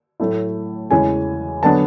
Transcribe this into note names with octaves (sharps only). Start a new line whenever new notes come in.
A2 F#3 A3 E4
E2 C#3 E3 G#3 C#4 G#5
D3 F#3 B3 D4 A5